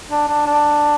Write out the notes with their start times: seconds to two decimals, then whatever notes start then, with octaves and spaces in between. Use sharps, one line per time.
0.10 D4
0.28 D4
0.46 D4